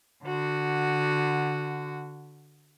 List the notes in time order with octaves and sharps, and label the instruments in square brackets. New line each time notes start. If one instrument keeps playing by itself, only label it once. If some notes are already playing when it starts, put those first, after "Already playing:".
[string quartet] D3 F#4